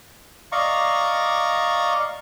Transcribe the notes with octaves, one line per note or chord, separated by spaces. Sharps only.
D5 D#5 F5 A#5 C#6